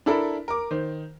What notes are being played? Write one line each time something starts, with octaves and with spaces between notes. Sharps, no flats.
D4 E4 A4 A#4 B5
A#4 D6
D#3 C5